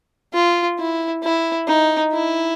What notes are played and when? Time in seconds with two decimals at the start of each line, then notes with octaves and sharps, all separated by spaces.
0.33 F4
0.78 E4
1.23 E4
1.67 D#4
2.12 E4